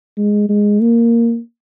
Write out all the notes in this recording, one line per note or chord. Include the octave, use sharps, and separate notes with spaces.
G#3
G#3
A#3